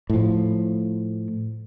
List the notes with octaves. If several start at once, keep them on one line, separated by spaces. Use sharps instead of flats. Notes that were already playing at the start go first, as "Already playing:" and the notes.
A2 F3